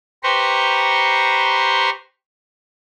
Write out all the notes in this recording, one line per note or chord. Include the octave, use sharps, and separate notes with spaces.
G4 B4 C5 A#5 C6 C#6